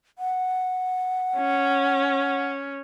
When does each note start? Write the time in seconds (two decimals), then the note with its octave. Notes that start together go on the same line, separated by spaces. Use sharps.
0.19 F#5
1.37 C#4